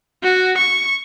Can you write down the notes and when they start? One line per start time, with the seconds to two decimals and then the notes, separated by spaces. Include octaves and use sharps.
0.23 F#4
0.58 C#6